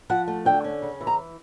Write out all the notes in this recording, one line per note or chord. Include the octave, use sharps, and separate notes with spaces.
F3 F#5
A3
D3 G5
C#4
C#3
E3
A#5